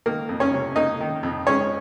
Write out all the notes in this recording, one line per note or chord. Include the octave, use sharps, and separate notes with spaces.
D#3 A#3 A#4
F2
C#4 C#5
C3
A#3 D#4 D#5
D#3
F2
G#3 C#4 C#5